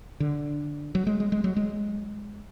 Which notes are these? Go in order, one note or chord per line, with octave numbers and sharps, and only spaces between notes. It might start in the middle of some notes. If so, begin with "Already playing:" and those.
D3
F#3
G#3
G#3
G#3
F#3
G#3